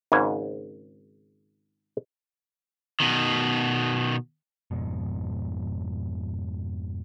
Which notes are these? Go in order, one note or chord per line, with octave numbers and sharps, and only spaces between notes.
G#1 G#2 C#3 G#5
B2 D#3
F2 G#2 B2